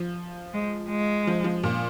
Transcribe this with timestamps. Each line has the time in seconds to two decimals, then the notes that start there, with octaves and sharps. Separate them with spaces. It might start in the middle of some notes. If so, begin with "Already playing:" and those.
Already playing: F3
0.54 G#3
0.90 G#3
1.27 F3
1.44 F3
1.63 A#2